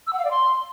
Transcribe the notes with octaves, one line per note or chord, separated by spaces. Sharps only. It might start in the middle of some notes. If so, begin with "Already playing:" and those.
E6
F#5
F5
D5
C6